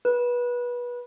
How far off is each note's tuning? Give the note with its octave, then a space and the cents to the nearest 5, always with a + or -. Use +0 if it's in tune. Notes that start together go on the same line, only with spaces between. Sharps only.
B4 -25